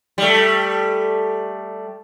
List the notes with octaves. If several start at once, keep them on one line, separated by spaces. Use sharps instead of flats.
G3 A3